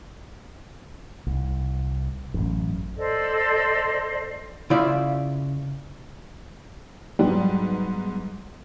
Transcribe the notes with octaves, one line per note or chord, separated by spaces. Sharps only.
C2
A1 F#2
A4 C5 D5 D#5
C#3 E4 F4 D5 E5
G#2 F#3 G3 B3